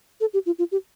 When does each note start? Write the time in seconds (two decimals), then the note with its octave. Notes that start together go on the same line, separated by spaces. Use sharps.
0.21 A4
0.34 G4
0.46 F4
0.59 F4
0.72 G4